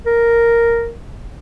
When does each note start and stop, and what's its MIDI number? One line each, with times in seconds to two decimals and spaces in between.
0.06 0.91 70